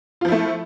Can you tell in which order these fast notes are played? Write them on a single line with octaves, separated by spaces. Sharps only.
F4 F3 E4 A3